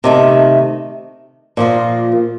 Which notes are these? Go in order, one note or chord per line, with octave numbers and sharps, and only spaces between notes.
C3 D#3 A3
A#2 F3 A#3 F4